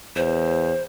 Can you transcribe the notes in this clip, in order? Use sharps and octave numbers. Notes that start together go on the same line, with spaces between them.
E2 C5